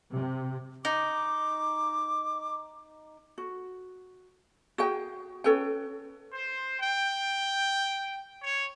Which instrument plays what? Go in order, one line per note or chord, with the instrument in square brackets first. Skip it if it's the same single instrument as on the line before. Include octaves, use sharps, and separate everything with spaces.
[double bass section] C3
[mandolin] D#4 [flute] D6
[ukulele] F#4
F#4 G#4 G5
C#4 A4 B4 G5
[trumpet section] C5
G5
C#5